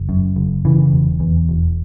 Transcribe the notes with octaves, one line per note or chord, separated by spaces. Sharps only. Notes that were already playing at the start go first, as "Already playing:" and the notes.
Already playing: F#1
F#2
F#1
C#3 E3
E1
E2
E1